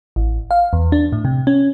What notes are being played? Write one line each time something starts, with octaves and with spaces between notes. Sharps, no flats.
A1
F5
E2
D4
A2
C3
C#4